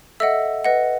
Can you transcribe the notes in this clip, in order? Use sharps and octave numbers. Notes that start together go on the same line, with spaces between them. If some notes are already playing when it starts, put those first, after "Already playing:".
A4 D#5 E5 F#5 E6
B4 D#5 F#5